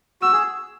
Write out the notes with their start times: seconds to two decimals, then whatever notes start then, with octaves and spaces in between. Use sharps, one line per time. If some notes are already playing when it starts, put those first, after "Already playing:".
0.22 F#4 E6
0.32 G#4